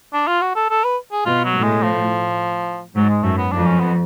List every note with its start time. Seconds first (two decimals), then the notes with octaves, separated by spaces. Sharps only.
0.13 D4
0.28 F4
0.42 F#4
0.55 A4
0.70 A4
0.84 B4
1.12 G#4
1.26 B2 F4
1.45 F#3
1.54 A2
1.63 G#3
1.82 F3
2.95 G#2 F#3
3.09 G#3
3.23 F#2 A3
3.38 B3
3.51 F2 D4
3.66 C#4
3.79 B3